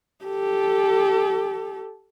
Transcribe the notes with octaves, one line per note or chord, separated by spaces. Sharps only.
G4 A4